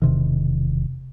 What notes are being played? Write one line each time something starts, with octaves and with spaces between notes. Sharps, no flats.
E1 C3 D#3